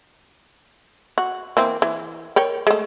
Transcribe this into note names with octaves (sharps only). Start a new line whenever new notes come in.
F#4
E3 A#3 C4
E3
A#4 C#5 G5
G#3 A3